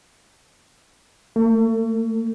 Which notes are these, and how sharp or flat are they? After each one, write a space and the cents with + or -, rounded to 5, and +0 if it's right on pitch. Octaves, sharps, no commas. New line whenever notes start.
A3 +40